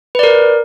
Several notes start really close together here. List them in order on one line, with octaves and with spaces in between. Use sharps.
B4 D5 A#4